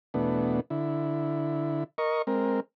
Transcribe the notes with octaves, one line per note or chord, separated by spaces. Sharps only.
E2 B2 A3 B3 D4
D3 E4
A#4 D#5 C#6
G#3 C4 A#4